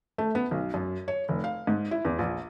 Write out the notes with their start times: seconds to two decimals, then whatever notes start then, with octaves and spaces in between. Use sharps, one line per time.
0.18 A3
0.35 B3
0.51 B1
0.74 F#2
1.08 C#5
1.29 F1
1.44 F5
1.67 G#2
1.91 E4
2.05 E2
2.19 A#1